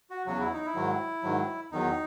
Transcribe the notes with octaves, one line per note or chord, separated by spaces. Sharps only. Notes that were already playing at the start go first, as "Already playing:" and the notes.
F#4
E2 C#3 F#3 F#4
E4
D#4
E4
G#2 D#3 F#3
G#2 D#3 F#3
E2 D#3 F#3 D#4